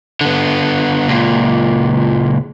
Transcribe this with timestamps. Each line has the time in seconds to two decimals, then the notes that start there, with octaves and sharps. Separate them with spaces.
0.21 D3 B3
1.08 C#2 A#2